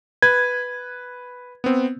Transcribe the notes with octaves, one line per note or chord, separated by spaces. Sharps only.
B4 G#6
B3 C4